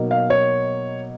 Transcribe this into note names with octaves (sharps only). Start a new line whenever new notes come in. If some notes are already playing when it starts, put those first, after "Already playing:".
Already playing: B2 F#3 A#3 D#4
F5
C#5